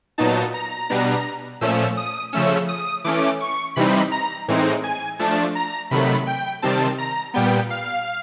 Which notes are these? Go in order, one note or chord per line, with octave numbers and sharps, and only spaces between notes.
A#2 F#3 B3 D#4 A5
A#5
B2 G3 B3 D4
A#2 F3 A3 C#4 E6
D#6
C#3 F3 A3 C#4 E6
D#6
E3 A3 C#4 D6
C#6
C3 E3 G3 C4 D#4 B5
A#5
A2 E3 G#3 C4 D#4
G#5
F3 A3 D4 A5
A#5
C3 D#3 F#3 A3 B5
G5
C3 D#3 G3 C4 A5
A#5
A#2 G3 B3 G5
F5